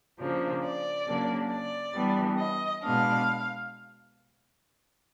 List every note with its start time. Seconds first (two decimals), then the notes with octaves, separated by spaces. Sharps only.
0.19 C#3 F3 A#3 D4
0.63 D5
1.07 C#3 F#3 A#3 D4
1.51 D5
1.94 E3 G3 B3 D4
2.38 D#5
2.82 B2 G#3 B3 D4 F5